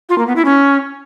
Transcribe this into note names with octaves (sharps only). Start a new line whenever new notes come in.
F4
A#3
B3
E4
C#4